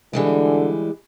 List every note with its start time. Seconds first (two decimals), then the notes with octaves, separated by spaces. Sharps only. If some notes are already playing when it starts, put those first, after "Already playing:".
0.13 D3 E3 G3 G#3